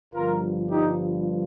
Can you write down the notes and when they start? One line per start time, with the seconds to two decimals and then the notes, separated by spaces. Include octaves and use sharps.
0.13 G1 G2 F3 F4 A#4
0.68 D#4 G4